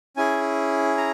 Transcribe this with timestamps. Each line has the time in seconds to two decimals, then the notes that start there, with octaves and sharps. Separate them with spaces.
0.17 C#4 E4 G#4 G#5
0.97 A#5